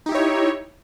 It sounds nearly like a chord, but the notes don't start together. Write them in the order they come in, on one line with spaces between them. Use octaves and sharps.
D#4 G4 E4 C#5